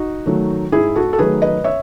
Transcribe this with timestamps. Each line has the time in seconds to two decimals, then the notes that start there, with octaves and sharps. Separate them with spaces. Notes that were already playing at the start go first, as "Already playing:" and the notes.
Already playing: D#4 F#4
0.26 D#3 F#3 A3
0.72 G#2 E4 G#4
0.96 F#4 A4
1.13 A4
1.18 D#3 F#3 A3 G#4 B4
1.42 B4 D#5
1.64 C#5 E5